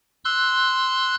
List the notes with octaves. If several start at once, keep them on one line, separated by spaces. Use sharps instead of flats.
C6 E6 F#6